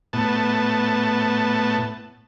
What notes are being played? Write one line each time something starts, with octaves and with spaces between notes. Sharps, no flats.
A2 B3 A5